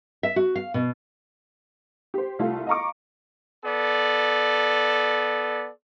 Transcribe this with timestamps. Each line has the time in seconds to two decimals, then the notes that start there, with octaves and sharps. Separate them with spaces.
0.23 E5
0.36 F#4
0.55 F5
0.74 B2
2.14 G4 C5
2.39 C2 A3 F4
2.67 D#5 F5 A#5 C#6 D6
3.65 B3 A4 D5